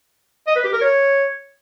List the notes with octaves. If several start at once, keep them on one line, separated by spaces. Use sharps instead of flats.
D#5
B4
G4
A#4
C#5